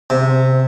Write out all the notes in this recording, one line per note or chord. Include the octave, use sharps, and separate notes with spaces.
C3